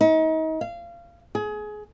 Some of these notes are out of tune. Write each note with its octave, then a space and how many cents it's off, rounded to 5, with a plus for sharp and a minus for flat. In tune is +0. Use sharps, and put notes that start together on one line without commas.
D#4 +35
F5 -25
G#4 +25